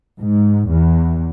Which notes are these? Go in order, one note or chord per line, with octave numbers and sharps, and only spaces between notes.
G#2
E2